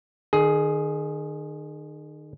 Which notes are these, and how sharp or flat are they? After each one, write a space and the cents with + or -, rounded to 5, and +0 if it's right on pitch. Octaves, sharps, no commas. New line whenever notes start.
D#3 -35 G#4 +10